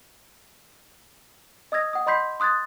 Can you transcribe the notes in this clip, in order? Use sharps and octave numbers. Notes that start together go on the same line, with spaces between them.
D#5 D#6 E6 G#6 A#6
F#5 D#6
D#5 B5 C6 G6 B6 C7
C6 D#6 F#6 G#6 A6